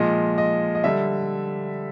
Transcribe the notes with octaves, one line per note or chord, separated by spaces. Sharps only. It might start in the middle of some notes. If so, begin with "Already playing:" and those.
Already playing: A#2 F3 G#3 D#5
D#5
D#5
D3 G3 E5